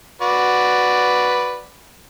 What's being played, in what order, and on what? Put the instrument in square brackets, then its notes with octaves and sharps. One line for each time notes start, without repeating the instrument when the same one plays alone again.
[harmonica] F#4 B4 D5